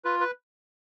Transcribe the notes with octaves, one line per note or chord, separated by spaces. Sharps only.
F4 B4
B4